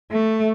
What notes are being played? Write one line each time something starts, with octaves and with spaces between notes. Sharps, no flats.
A3